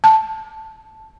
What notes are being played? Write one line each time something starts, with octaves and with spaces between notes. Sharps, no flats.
A5